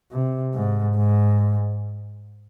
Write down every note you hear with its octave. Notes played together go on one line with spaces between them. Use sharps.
C3
G#2
G#2